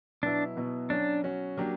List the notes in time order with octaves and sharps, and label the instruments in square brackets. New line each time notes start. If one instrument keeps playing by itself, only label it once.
[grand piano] B2 F#3 B3 E4 [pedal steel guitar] D4
[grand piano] B2 F#3 B3 E4
[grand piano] F#3 C#4 F#4 [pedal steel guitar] D4
[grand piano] F#3 C#4 F#4
F#3 A#3 D4 G4